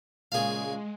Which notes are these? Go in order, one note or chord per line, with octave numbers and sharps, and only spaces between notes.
A#2 C#3 G#3 G#4 F5